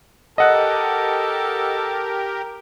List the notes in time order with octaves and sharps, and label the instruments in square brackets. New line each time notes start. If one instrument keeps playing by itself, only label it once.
[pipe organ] G4 A#4 [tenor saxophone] A4 [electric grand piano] D#5 F#5 F#6